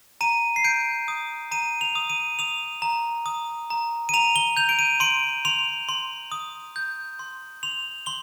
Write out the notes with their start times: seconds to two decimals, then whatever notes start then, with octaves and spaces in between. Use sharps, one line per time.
0.21 A#5 D#7
0.56 C7
0.64 G6 D7
1.08 D#6
1.51 A#5 D#7
1.81 F7
1.95 D#6
2.10 D#7
2.39 D#6 F7
2.82 A#5
3.26 D#6
3.70 A#5
4.09 D#7
4.14 A#5 F7
4.36 G7
4.57 G6 F7
4.69 D7
4.79 D#7
5.00 C6 D7
5.45 C6 F7
5.89 C6
6.32 D#6
6.76 G6
7.19 C6
7.63 C6 F7
8.06 C6 G7